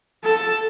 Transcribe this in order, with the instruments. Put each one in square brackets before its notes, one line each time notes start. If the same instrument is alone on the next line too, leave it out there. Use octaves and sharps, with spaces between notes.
[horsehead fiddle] A4